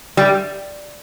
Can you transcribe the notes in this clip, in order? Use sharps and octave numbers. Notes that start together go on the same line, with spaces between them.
G3